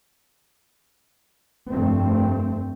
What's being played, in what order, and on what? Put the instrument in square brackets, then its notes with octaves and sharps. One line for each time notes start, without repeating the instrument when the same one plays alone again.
[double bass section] F1 G2 A3 C4